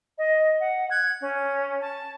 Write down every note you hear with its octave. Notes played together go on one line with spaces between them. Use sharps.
D#5
F#5
F#6 G#6
C#4
A5